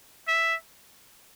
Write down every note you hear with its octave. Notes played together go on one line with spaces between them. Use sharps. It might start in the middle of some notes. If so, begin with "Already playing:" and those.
E5